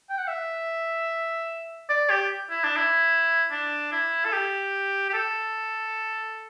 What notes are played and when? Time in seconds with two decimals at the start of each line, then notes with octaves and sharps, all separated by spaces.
0.10 G5
0.18 F#5
0.27 E5
1.89 D5
2.10 G4
2.50 E4
2.64 D4
2.76 E4
3.51 D4
3.92 E4
4.25 A4
4.32 G4
5.10 G4
5.13 A4